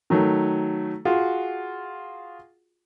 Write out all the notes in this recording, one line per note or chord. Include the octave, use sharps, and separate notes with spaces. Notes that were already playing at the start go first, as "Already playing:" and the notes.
D#3 F#3 A3
F4 F#4 G#4